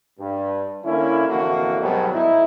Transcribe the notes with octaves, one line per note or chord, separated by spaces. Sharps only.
G2
D3 A#3 C#4 E4
A1 F2 D3 A#3 E4 F#4
G#2 B2 D#3 F#3 G3 B3
A2 D#4 E4